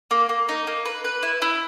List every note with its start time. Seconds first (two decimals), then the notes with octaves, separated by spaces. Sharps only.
0.11 A#3
0.29 A#3
0.49 D#4
0.67 A#3
0.85 B4
1.04 B4
1.23 E4
1.42 E4